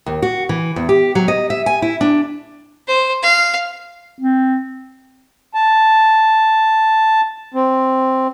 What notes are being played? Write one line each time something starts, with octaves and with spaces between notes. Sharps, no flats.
D#2
F#4
E3
E2
G4
F#3
D#5
E5
G#5
E4
D4
C5
F5
C4
A5
C4